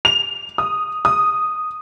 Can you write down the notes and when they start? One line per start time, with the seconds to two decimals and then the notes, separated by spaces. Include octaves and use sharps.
0.05 F7
0.58 D#6
1.05 D#6